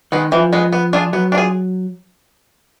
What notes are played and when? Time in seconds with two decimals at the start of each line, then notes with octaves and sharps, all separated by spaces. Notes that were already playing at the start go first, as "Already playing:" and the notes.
0.12 D#3 G#3 B3
0.32 E3 F3
0.53 G#3 B3
0.73 B3
0.93 D4 F4 G#4
1.13 F#3 B3
1.32 D4
1.35 F4 G#4